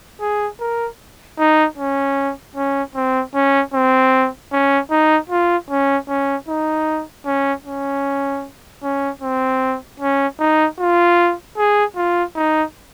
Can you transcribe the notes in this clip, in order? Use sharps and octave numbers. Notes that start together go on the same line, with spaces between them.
G#4
A#4
D#4
C#4
C#4
C4
C#4
C4
C#4
D#4
F4
C#4
C#4
D#4
C#4
C#4
C#4
C4
C#4
D#4
F4
G#4
F4
D#4